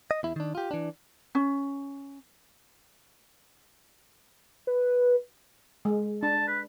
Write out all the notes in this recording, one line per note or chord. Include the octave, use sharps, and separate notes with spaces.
D#5
E2 E4
D#3 D4
F4 G4
E3 D4
C#4
B4
G#3
D4 A5
B4